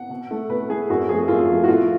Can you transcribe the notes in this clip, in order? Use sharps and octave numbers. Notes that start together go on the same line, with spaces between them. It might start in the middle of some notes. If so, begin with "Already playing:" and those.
Already playing: F#5
B2
A3
B2 B4
A3 G#4
F#2 F#4
F3 A3 G#4
F#2 F4
F3 A3
F#4
A2 F4